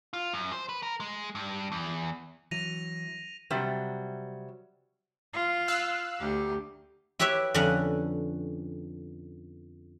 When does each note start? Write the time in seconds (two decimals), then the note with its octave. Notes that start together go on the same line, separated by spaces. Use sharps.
0.13 F4
0.33 F#2
0.52 C5
0.69 B4
0.83 A#4
1.00 G#3
1.35 G2
1.72 E2
2.51 E3 F#3 A#6 D#7 F7
3.50 C3 F#3 G3
5.34 F4
5.68 F5 E6 F#6
6.19 D2 G4
7.19 E4 G4 B4 C#5 E5
7.54 F2 D3 C#4 B4 F#5